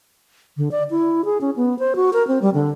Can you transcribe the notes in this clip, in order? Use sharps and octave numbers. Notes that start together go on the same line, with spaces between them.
D3
D5
E4
G#4
C#4
B3
C5
F#4
A#4
C4
G3
D3